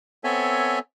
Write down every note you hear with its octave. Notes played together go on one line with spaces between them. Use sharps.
B3 C4 A4 C#5 E5 G#5